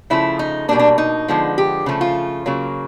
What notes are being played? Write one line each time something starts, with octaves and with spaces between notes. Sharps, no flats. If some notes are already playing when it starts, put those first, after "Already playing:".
C#3 F3 A3 E4
D#4
B2 G3 A#3 D4
D4
D#4
D3 F3 G#3 B3
G4
C#3 F3 A3
F4
C#3 F#3 A#3